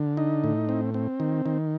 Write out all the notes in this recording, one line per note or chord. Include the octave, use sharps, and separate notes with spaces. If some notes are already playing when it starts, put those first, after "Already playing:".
Already playing: D3
D#4
A2
C4
C4
D#3
D#3